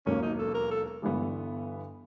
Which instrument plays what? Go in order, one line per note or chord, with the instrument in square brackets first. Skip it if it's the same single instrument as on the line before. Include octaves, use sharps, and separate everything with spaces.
[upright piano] E1 D#2 D#3 F#3 A#3 [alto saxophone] C#4
[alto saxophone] D#4
A4
A#4
A4
[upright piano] G1 G2 E3 G3 B3